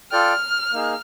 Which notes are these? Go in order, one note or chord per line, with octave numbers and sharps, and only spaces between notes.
F4 A4 D5 G5 F6
A#3 D#4 G#4